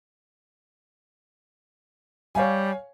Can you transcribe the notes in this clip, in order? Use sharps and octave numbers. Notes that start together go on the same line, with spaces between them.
G3 C#5 F5 G#5